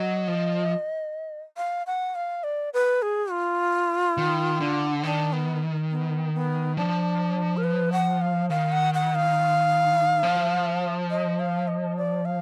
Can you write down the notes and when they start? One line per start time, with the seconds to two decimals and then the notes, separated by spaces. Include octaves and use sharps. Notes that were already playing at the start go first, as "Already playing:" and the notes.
Already playing: F#3 D#5
0.28 F3
1.57 F5
1.87 F#5
2.15 F5
2.44 D5
2.74 B4
3.02 G#4
3.31 F4
4.17 D#3
4.60 D3
5.03 D#3 D4
5.33 B3
5.91 B3
6.34 B3
6.77 F3 D4
7.57 A#4
7.64 B4
7.92 F#5
8.21 F5
8.50 D#3 F5
8.72 F#5
8.94 F#5
9.15 F5
10.23 F3
11.10 D#5
11.40 F5
11.68 D#5
11.97 D5
12.25 F5